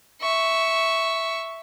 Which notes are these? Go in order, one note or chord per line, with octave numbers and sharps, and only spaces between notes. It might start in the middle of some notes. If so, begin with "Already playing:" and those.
E5 C#6